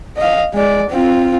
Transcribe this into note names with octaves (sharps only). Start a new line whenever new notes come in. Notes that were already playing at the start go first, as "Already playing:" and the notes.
D#5 F5
G#3 D5
C4 F4